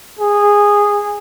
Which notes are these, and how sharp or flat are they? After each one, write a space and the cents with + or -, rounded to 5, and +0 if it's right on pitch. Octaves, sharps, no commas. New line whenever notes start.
G#4 -15